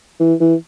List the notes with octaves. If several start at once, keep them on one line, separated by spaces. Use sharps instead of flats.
E3
E3